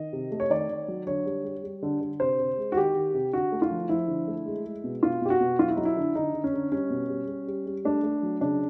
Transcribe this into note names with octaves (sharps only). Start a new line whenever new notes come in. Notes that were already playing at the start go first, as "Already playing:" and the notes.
Already playing: D#3 D#5
C3
A3
C#5
D#3 D5
D#3
F#3
D3 C#5
G3
G3
G3
D3
D3
C3 C5
C3
G#3
F#4
D#3 G4
D#3
C3
D3 F#4
A3
F4
F3
F3 E4
D3
A3
G#3
G#3
B2
B2 F4
B2 G4
F#4
B2
F#3 F4
E4
F#3 D#4
E4
D3
D3 D#4
D3
C#4
D3
G3 C#4
B2
G3
G3
G3
G3
A3 D4
A3
F#3
C#3 D4